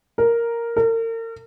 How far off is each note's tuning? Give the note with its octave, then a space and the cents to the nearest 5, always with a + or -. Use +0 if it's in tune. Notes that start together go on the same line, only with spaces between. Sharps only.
A#4 +0
A#4 -40